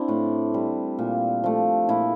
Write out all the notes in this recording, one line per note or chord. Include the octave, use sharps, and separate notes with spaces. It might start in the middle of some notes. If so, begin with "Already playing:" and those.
Already playing: C4 D4 E4
A2
G3
A#2
F3 A3
A#2 E4